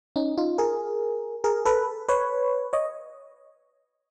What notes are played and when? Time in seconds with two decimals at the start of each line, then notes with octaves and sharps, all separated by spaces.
0.16 C#4 D#4
0.38 D#4 F4
0.58 G#4 A#4
1.44 G#4 A#4
1.65 A4 B4
2.09 B4 C#5
2.73 C#5 D#5